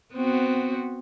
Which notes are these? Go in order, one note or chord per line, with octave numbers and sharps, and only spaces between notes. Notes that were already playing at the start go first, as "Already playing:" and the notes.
B3 C4 F#4